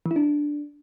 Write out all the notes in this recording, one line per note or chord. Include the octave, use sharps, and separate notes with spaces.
E3
E4
D4